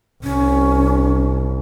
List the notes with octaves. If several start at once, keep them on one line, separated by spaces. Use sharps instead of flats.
C2 C#4